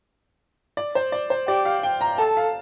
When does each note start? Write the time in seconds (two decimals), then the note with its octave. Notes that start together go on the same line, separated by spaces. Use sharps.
0.77 D5
0.95 C5
1.12 D5
1.30 C5
1.48 G4 D5
1.65 F5
1.83 G5
2.01 A#5
2.18 A4 A5
2.37 F5